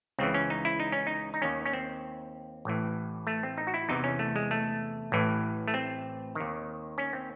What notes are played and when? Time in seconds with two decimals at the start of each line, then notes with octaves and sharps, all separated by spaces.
0.19 C#2 C#3 E3 C4
0.34 C#4
0.50 D#4
0.65 E4
0.80 D#4
0.92 C#4
1.07 D#4
1.34 D#4
1.42 D#2 D#3 C#4
1.65 C#4
1.73 C4
2.65 A1 A2 E3
3.27 A3
3.43 C4
3.58 D#4
3.67 F#4
3.74 E4
3.89 E2 C3 E3 D#4
4.04 C#4
4.19 A3
4.36 G#3
4.51 A3
5.12 A1 A2 E3
5.68 A3
5.74 C4
6.35 D#2 D#3
6.98 C#4
7.13 C4